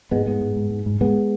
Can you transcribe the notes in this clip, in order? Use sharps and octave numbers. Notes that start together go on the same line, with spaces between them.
G#2 G#3 B3
G#2 G#3 B3
G#2
G#2
G#2
G#2
G#2 G#3 B3